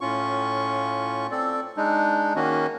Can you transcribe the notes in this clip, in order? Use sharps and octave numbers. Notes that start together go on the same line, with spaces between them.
A2 C#4 F4 C#6
C4 A4 D5
G#3 D4 D#4
D#3 A#3 C#4 F#4